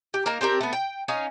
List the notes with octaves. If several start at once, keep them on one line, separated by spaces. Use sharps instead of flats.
G4
A#3 D#4 A#4
C4 D4 G4 A#4
A3 B3
G5
C#4 D#4 F5